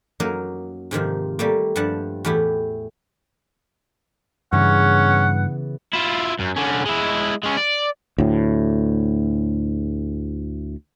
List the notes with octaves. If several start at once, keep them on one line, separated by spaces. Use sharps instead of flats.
F#2 F#3 A#3 D#4 A#4 A#5
G#2 C3 D#3 F3
G3 A3 A#3
G2 F3 G3 F#5 A5
E2 A2 A3 E4 G4
G2 C#3 E3 B3 C#4 F#5
E4 F4
F#2
D3 C#4
G#3 E4
G#3 C#4
D5
D2 A2